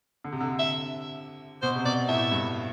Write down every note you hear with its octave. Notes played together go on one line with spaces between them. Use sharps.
D3
C3
D3
E5
B2 C5
C3
B2 D5
A2 E5
G2